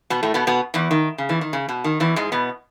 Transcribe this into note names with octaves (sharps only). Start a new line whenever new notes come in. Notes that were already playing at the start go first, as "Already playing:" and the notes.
B2 B3
A2 A3
B2 B3
B2 B3
E2 E3
D#3
C#3
E2 E3
D#3
C#3
B2
D#3
E2 E3
G#2 G#3
B2 B3